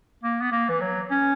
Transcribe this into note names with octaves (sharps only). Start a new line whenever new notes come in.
A#3
B3
A#3
E3
F#3
C#4